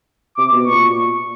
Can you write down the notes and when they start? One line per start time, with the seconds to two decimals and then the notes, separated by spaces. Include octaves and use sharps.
0.37 C3 D6
0.52 B2
0.67 A#2 C#6